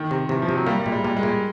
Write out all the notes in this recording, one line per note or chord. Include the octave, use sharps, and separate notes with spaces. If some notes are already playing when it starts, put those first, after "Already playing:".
Already playing: D#3
C3
C3 E3
F3
C3
F#3
G3 A#3
G3
A#2 G#3
G3
A#2 G3
G#3
A#2
G3